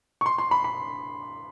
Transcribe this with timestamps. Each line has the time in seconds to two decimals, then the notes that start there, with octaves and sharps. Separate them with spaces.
0.21 C#6
0.26 C6
0.38 C6
0.51 B5
0.64 B5